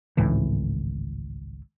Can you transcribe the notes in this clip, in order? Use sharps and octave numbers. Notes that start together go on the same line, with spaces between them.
G#1 C#2 A2 E3